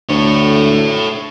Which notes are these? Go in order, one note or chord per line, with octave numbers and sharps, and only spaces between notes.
D2 A4 C#5